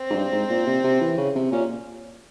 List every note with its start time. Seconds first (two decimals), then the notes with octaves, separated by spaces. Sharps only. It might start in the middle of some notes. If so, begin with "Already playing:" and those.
Already playing: C4
0.10 G#2
0.15 G2
0.32 G#2
0.50 A#2
0.66 C3
0.84 C3
1.01 E3
1.17 C#3
1.35 C3
1.52 A#2 C#4